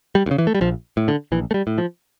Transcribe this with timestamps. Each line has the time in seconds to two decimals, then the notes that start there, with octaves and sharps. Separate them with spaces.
0.15 G3
0.26 D2
0.31 C#3
0.38 E3
0.47 A3
0.55 G3
0.61 A#1 F3
0.97 A2
1.08 D3
1.32 A#1 E3
1.51 A3
1.54 G3
1.67 A2
1.78 F3